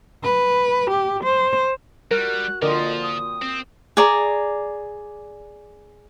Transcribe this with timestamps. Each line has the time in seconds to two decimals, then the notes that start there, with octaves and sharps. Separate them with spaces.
0.24 B4
0.90 G4
1.23 C5
2.11 G3 F#4 A#4 F#6
2.62 A#2 D3 F3 C4 A#4 D#5
3.02 D#6
3.42 C4
3.97 G#4 D5 A#5